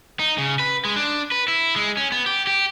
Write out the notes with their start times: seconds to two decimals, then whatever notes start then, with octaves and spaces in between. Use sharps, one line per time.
0.20 D#4
0.38 C#3
0.60 B4
0.85 G#3
0.96 D4
1.32 B4
1.48 E4
1.76 G#3
1.97 C#4
2.12 B3
2.26 G4
2.47 G4